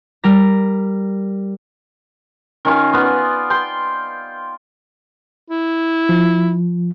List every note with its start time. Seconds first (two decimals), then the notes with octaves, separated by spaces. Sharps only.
0.24 G3 A#4 A#6
2.65 D#3 C#4 F4 G#5
2.93 B3 F4 D5
3.50 G5 C6
5.50 E4
6.09 F3